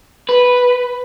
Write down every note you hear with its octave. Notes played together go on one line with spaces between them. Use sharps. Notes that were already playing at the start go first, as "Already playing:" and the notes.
B4